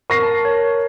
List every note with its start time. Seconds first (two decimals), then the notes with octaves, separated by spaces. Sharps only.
0.10 A#4 C#6 A#6 C7
0.23 A5
0.45 A#4 C#5